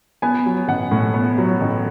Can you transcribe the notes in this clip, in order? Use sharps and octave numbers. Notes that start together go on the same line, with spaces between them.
B3 G#5
F#3
A1 F#5
A2
B3
F#3
A1